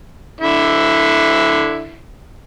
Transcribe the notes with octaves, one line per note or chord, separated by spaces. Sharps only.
D3 E4